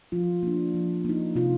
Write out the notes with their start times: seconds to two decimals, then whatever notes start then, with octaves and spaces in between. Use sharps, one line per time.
0.12 F3 F4
0.43 A#3 D4
0.74 F3
1.05 A#3 D#4
1.36 C3 F4